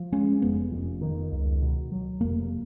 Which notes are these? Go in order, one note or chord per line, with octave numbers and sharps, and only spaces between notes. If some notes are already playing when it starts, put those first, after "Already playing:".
Already playing: F3
G#3 C#4
F1 B3
F2
D#3
C#2
B2
F#3
F1 A#3